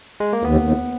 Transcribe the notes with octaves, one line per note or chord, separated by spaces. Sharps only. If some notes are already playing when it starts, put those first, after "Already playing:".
G#3
A#3
D#2 B3
D#2